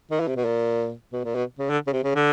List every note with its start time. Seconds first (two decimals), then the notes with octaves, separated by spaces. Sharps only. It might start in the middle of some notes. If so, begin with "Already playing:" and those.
0.11 D#3
0.20 E3
0.28 C3
0.36 B2
0.45 A#2
1.13 B2
1.24 A#2
1.35 B2
1.59 C#3
1.70 D3
1.87 C#3
1.93 C3
2.04 C#3
2.15 D3